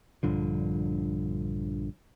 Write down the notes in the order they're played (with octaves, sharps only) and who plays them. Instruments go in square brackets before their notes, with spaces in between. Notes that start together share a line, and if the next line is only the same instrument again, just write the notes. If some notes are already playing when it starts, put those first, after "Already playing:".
[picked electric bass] A#1 G2 D3 F3